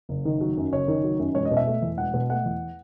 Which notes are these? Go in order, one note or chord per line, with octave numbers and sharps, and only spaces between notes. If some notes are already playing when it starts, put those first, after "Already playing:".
F#1
D#3
F#3
F#2
F#1 C#5
D#3
F#3
F#2
E1 C#5
D#5
B2
E5
A3
E2
E1 F#5
B2
A3 F#5
E2